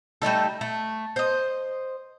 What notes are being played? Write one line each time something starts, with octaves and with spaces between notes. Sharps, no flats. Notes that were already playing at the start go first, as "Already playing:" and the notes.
G3 A3 D#4 A4
A3
C5 D#5